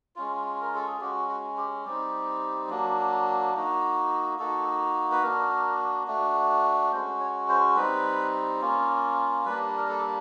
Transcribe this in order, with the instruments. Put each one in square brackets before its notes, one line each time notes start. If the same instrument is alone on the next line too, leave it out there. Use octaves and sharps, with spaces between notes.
[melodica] G#3 C#4 F4
A#4
A4
G#4
G#3 C#4 F#4 G4
F#4
G4
G3 C4 D#4 G4
F#3 A#3 D4
A#3 D#4 F#4
A#3 D#4 F#4 A4
B4
A#3 D4 F#4 A#4
A3 D4 F#4
G#3 C#4 F#4 C5
C#5
C5
G3 C4 D#4 B4
A#3 C#4 F4
G3 A#3 D4 B4
A#4
A4